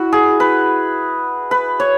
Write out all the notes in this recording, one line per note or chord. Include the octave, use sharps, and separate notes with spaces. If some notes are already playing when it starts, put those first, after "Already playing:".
Already playing: E4 F#4
G#4
B4
B4
C#5